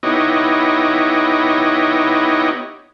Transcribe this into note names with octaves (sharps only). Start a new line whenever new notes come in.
B3 D#4 E4 G4 C#5 D#5